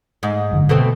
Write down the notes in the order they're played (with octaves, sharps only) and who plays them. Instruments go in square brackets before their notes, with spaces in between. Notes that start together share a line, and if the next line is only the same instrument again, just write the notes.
[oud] G#2
[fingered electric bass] G1 F#2 D3
[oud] B2 A3 C4